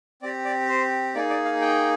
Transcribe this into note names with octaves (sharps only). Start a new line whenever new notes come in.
C4 G4 D5
D5
C5
A#3 D#4 G#4 D5
D5
F5
G5